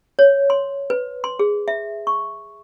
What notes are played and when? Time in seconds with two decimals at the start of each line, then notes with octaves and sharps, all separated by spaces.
0.19 C#5
0.50 C6
0.90 B4
1.24 C6
1.39 G#4
1.68 E5
2.07 C#6